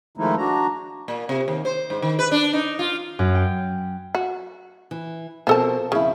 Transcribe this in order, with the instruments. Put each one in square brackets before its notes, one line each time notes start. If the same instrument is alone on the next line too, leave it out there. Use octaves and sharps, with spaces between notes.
[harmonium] D#3 F3 G#3 A3 D#4 E4
D4 F#4 A#5
[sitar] A#2
C3
D#2
C5
G#2
D#3
B4
D4
D#4
F4
[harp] F#2
G5
[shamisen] F#4
[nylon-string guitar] E3
[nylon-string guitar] B2 C4 A#4 [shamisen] F3 A4 A5
[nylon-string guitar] F2 E4 [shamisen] C#3